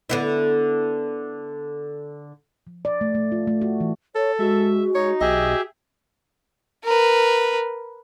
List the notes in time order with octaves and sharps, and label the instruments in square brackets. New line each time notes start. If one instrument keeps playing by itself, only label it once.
[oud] D3 B3 E4
[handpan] F3
D5
A3
A3
F4
A3
F#4
E3
[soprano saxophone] A4 [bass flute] C#5
[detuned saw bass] G#3 [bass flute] F#4 [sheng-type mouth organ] E5
[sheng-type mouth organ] D#4 [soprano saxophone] C#5
[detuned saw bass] B1 [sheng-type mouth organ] G4 G#4 E5 [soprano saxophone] D#5
[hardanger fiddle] A#4 B4